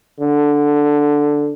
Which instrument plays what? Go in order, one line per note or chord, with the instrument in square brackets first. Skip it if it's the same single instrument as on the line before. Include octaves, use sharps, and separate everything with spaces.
[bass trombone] D3